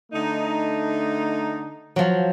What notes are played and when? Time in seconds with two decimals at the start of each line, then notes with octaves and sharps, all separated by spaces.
0.12 D3 A3 D#4
1.96 F3 F#3